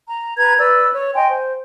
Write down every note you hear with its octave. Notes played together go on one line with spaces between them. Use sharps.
A#5
B4 A#5 G#6
B4 D5 E6
C#5
D#5 G5 G#5 C6
C5